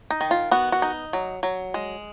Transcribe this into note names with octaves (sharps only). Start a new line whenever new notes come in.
D#4
D#3
F4
B3 F#4
F#4
D#4
F#3
F#3
G#3